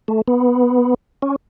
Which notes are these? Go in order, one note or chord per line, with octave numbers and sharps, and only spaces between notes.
A3
B3
C#4